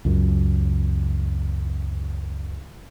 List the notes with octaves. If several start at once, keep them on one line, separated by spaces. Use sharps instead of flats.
C#2 F#2